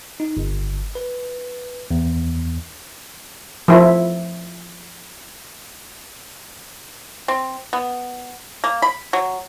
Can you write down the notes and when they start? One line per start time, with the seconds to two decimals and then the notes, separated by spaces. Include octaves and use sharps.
0.20 D#4
0.37 G1
0.95 B4
1.91 E2
3.68 F3 E4
7.28 C4
7.73 B3
8.64 A#3
8.82 B5
9.13 F#3